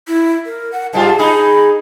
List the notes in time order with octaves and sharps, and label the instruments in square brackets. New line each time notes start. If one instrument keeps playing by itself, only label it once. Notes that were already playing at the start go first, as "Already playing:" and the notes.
[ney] E4
A#4
F#5
[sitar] G#2 G3 F4 [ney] A5
[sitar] D#4 G#4 [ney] B5